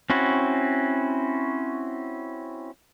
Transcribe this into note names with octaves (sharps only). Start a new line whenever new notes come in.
C4 C#4 E4 F#4